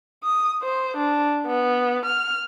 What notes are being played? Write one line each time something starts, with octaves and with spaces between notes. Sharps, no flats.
D#6
C5
D4
B3
F6